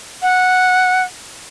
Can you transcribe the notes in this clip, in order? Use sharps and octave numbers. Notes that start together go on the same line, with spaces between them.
F#5